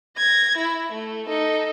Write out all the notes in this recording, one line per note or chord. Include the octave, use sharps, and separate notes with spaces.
G#6 A#6
E4
A3
D#4 A4